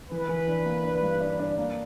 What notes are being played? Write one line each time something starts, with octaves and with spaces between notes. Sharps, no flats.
E3 B4
E3
D4
A#3
D4
G2
D4
D4
A#3